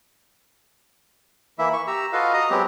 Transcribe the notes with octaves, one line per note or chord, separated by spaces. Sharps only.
E3 A#3 E4 E5
C#6
G4 A#5 E6
F4 F#4 A4 B4 D#5 F5
D#5 A#5 D#6
F#3 G#3 B3 C4 G4